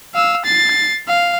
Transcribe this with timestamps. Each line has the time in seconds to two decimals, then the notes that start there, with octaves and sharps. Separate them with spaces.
0.14 F5 E6
0.45 A6 C7
1.08 F5